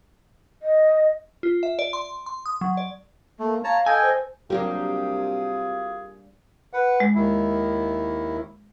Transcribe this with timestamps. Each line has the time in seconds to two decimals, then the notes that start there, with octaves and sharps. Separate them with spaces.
0.62 D#5
1.43 F4
1.63 E5
1.79 D5
1.93 C6
2.26 C6
2.46 D#6
2.61 F#3
2.77 D5
3.39 A3 A#3
3.64 C#5 F5 A5 A#5
3.86 A4 D#5 G5 G#5
4.02 C5
4.50 C3 F#3 G3 A#3 D4 F4 G4 G#4
6.73 B4 F#5
7.00 G#3
7.15 D#2 D#3 E4